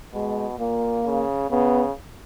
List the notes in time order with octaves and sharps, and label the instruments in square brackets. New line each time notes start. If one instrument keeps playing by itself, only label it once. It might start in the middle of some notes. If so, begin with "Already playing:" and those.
[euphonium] B2 [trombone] G#3
[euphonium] A#2 [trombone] A#3
[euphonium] C#3
[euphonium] C#3 [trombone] B3